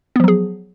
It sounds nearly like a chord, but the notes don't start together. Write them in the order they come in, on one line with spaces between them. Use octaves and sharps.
B3 F3 F#3 G#4